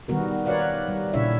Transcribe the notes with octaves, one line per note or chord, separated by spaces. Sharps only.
D#3 G3 B3 F#4 A#4
A#4 B4 C#5 D5 F5 F#5
G3
A#2 C#3 D4 E4 C#5 E5